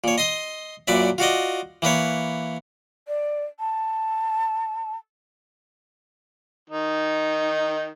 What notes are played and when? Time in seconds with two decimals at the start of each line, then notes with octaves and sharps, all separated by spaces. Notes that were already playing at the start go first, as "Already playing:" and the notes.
0.04 A#2 C#5
0.18 D#5 C6 D#6
0.87 F#2 A#2 B4 D5 E5
1.18 F4 F#4 D5 D#5
1.82 E3 A#3 B4 C#5
3.07 D5
3.59 A5
6.70 D#3 D#4